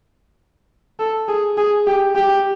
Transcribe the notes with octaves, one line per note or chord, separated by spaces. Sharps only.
A4
G#4
G#4
G4
G4